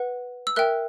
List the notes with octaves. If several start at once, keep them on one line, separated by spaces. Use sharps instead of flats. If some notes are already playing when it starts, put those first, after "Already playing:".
Already playing: B4 F#5
E6
A#4 E5 G5 F#6